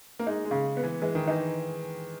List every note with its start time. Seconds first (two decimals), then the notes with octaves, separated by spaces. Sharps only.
0.19 A#3
0.27 G#3 D#4
0.45 G#3
0.51 C#3
0.77 B3
0.83 E3
1.02 E3 G#3
1.15 D#3
1.27 E3 D#4